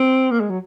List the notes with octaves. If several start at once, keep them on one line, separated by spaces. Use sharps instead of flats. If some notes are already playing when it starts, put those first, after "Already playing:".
Already playing: C4
A#3
G#3
F#3